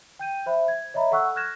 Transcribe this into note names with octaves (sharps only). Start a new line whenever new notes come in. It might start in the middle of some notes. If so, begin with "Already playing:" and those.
G5 G6 D#7
C5 E5 B5
G#6
C#5 D#5 E5 A#5 B5
A4 F#5 C#6 E6 F#6
F6 F#6 G#6 A#6 E7